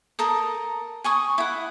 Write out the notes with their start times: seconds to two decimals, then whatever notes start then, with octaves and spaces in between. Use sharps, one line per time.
0.19 A4 A#4 A#5 D#6
1.04 G#5 C#6 D#6
1.38 E4 F#5